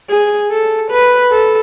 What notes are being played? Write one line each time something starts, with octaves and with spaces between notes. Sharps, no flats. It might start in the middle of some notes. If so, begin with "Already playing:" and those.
G#4
A4
B4
A4